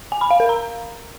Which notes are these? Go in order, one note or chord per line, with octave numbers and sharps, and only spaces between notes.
G#5
B5
F5
A#4
A#5